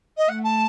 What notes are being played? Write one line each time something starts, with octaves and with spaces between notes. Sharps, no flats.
D#5
A3 F#5
A5